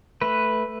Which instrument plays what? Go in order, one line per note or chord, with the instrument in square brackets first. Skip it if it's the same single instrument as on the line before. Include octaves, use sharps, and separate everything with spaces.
[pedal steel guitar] A3 B4